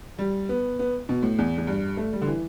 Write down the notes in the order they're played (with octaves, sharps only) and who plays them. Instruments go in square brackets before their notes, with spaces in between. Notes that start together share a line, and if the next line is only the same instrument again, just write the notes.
[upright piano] G3
B3
B3
B2
A2
E2
E2
G2
A3
G3
D3
E3